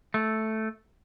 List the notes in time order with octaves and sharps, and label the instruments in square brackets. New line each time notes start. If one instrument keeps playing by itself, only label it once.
[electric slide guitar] A3